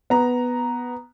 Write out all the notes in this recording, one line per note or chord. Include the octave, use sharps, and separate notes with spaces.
B3 A#5